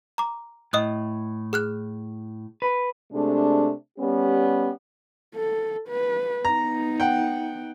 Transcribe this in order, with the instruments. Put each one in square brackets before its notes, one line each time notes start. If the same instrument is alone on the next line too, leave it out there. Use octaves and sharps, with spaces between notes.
[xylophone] A#5 D6
[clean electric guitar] A2 [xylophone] D#5 D#6 F#6
[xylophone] G#4 F6 F#6
[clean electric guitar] B4
[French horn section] C3 G#3 A3 D4
G3 B3 C#4 G4
[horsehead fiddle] A4
B4
[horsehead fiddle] B3 D#4 [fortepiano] A#5
[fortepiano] F#5 G5